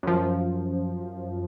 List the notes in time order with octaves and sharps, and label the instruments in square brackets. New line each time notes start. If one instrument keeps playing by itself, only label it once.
[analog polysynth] F#2 F3